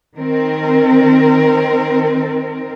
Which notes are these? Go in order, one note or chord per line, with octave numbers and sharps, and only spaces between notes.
D#3 C4 A#4